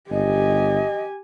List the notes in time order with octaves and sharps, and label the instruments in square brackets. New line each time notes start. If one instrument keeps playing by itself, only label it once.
[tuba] G1 [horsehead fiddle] G4 G#5 [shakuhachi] D#5